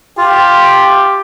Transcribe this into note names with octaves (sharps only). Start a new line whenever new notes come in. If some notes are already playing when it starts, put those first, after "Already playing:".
F4 G4